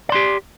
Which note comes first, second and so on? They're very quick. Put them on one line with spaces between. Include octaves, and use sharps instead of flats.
D5 C6 G4